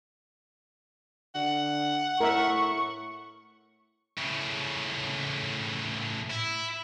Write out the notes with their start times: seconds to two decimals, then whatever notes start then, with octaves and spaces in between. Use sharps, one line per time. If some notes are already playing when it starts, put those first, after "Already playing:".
1.35 D3 F#5
2.20 A2 A#4 E5 C#6
4.17 A2 C#3
6.31 E4